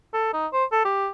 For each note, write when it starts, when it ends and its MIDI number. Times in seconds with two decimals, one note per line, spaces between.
0.13 0.32 69
0.33 0.47 63
0.53 0.65 72
0.72 0.84 69
0.85 1.09 67